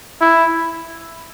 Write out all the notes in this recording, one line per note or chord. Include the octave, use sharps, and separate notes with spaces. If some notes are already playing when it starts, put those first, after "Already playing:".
E4